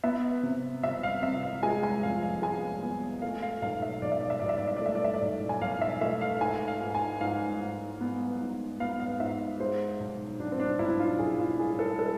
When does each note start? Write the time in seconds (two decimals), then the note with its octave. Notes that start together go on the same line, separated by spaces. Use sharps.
0.04 B3 E5
0.43 C3
0.83 C3 E5
1.03 F5
1.23 C3 E5
1.43 F5
1.63 G#3 G#5
1.83 G#5
2.03 F2 F5
2.23 F5
2.42 G#3 G#5
2.82 B3
3.22 A3 F5
3.42 F5
3.62 B1 F5
3.82 E5
4.02 B1 D5
4.12 E5
4.21 D5
4.30 E5
4.40 B1 D5
4.49 E5
4.58 D5
4.68 E5
4.76 D5
4.82 A3 E5
4.95 D5
5.04 E5
5.14 D5
5.22 B1
5.49 G#5
5.61 B1 F5
5.81 E5
6.01 A3 E5
6.21 F5
6.41 G#2 G#5
6.68 F5
6.81 G#2
6.95 G#5
7.21 G#2 F5
7.60 G#2
8.01 B3
8.40 G#2
8.80 B3 F5
9.00 F5
9.20 G#2 E5
9.60 G#3 C5
10.00 B1
10.39 B1 D4
10.52 C4
10.60 D4
10.79 B1 E4
10.99 F4
11.19 B1 G#4
11.39 F4
11.59 A2 G#4
11.79 A4
11.99 G#3 A4